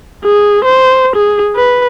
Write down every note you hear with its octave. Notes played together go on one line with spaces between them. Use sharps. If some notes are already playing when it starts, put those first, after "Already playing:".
G#4
C5
G#4
B4